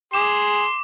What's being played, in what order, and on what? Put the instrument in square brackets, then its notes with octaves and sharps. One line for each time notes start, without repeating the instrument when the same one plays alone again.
[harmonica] G#4 [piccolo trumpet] C6 [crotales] D6 E7